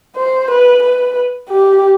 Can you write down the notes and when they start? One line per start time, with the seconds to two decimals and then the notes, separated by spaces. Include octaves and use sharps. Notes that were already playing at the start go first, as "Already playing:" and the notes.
0.17 C5
0.50 B4
0.83 B4
1.49 G4